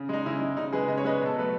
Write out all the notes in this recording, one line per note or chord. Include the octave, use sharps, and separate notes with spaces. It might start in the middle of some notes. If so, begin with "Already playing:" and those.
Already playing: C#3
G#3 D#4
C#3 E4
G#3
C#3 D#4
G#3 G#4 B4
C#3 D#5
C#5
G#3 B4 D#5
B2
A4
F#3 A3 B4